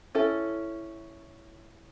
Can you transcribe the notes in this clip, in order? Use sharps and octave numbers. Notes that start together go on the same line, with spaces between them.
C#4 E4 A4